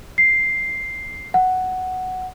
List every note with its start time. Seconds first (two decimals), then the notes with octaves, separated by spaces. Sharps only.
0.18 C7
1.34 F#5